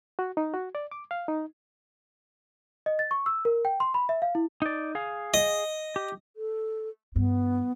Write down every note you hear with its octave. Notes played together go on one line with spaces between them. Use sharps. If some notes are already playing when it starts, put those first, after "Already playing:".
F#4
D#4
F#4
D5
D6
F5
D#4
D#5
A6
C#6
E6
A#4
G5
C6
B5
E5
F5
E4
D#4 D5
G#4 F5
D#5
G4
A4
G2 B3